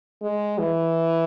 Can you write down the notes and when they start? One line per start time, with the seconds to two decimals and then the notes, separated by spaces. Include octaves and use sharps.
0.22 G#3
0.59 E3